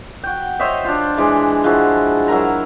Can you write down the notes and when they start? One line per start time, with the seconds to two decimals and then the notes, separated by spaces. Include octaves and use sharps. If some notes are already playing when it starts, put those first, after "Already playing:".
0.24 F#4 G5
0.59 C5 C#5 D#5 E5
0.85 D4 F4
1.17 E3 G#3 D4
1.64 F3 G#3 E4 F#4
2.28 F#3 E4 A#4 A#5